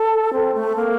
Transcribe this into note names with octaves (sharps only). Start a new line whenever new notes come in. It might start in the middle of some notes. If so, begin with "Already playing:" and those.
Already playing: A4
C4
A3
A#3